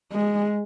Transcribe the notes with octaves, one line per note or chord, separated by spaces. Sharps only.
G#3